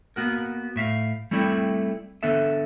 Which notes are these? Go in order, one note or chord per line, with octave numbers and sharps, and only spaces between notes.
A#3 B3 F#4 A#4
A2 E5 F5
G3 A3 C4 E4 D5
D3 B3 A4 E5